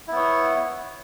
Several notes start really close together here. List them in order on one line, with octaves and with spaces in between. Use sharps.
E4 B3 C#5